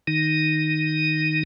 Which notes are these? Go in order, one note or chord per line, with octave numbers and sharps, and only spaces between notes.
D#3 D#4